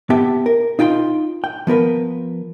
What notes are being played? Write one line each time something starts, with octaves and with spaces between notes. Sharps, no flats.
B3 G4 E5 A5
A#4
D#4 F4 G5 A5 C6
G5
F3 B3 A#4 B4